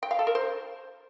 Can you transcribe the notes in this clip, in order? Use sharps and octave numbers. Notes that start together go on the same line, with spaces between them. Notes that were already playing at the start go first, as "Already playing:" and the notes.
G5
F5
A4
A#4
C5